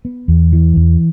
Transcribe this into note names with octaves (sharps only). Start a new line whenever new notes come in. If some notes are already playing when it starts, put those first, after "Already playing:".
B3
E2
E3
E2